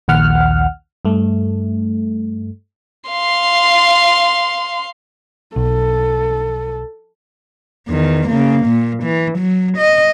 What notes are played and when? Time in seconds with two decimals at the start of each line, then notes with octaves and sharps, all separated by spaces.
0.08 A#1 D#2 F#5 F6
1.05 G2 A3
3.09 F5 C6
5.56 B1 A4
7.88 E2 D#3
8.29 C#3 A#3
8.66 A#2
9.04 E3
9.39 F#3
9.77 D#5